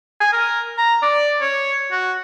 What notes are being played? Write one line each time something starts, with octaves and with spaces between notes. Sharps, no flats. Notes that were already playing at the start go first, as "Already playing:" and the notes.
G#5
A#4
A#5
D5
C#5
F#4